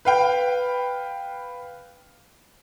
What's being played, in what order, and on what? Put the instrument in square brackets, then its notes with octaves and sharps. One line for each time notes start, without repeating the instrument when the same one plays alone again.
[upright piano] B4 F5 G5